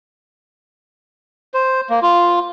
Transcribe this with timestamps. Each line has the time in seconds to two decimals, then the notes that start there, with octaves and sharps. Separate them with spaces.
1.54 C5
1.90 A#3
2.02 F4